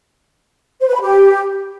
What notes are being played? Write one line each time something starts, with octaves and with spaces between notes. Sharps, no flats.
C5
B4
B5
G4